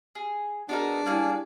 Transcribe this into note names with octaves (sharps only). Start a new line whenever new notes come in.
G#4
B3 D4 D#4 F#4 G#4 A#4
G3 A#3 C#4 E4 G#4